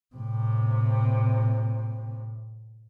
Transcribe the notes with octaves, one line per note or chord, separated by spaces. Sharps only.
A2 C3